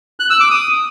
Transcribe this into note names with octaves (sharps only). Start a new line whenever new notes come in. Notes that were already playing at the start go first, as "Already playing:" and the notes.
F#6
E6
D6
D#6